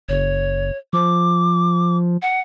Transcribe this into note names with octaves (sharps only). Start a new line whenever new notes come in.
F#1 C#5
F3 D6
F#5